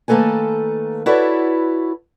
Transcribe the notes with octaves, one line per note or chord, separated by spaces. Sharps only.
D#3 A3 A#3 A4 B4 G#5
E4 F#4 A4 B4 C#5 D5